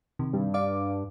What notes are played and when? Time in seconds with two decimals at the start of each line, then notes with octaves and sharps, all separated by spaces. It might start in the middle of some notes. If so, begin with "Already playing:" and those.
0.19 C3 D#3
0.33 G2
0.54 D5 F5 D6